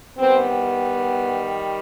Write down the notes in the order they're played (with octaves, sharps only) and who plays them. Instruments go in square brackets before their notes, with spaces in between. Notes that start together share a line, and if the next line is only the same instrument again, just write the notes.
[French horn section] D#3 G3 B3 C4